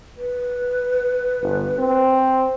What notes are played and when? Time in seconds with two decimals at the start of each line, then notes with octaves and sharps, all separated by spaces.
0.18 B4
1.42 G1
1.79 C4